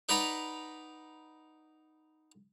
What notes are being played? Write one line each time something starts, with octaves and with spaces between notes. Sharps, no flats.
D#4 B4 D5 F#5 A#5 B5